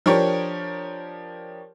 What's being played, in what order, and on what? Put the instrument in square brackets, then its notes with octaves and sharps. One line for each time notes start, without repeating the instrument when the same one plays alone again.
[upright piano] F3 D4 G4 A#4 C#5